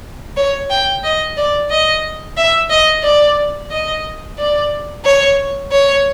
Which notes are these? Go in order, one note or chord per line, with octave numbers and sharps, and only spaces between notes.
C#5
G5
D#5
D5
D#5
E5
D#5
D5
D#5
D5
C#5
C#5